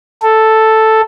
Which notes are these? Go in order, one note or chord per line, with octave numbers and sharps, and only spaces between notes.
A4